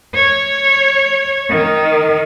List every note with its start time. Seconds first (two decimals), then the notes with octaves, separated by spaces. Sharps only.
0.14 C#5
1.49 D#3